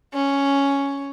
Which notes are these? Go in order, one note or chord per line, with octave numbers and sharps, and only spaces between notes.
C#4